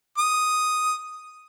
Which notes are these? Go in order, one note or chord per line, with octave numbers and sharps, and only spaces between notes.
D#6